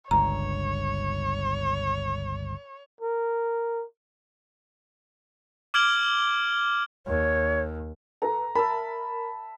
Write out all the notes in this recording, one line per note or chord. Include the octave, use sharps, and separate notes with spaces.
G1 C#2 G2 C#5 A#5
A#4
D6 F6 G#6 D7 F#7 G7
D#2 C#5
A4 B4 A#5
A#4 E5 A5 B5